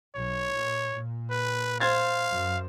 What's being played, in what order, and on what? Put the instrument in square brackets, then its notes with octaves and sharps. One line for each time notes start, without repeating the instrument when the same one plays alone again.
[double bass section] B1 [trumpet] C#5
[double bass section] A#2
A#2
[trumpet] B4
[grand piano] C5 G#6 A6 [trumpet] F5
[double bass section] F#2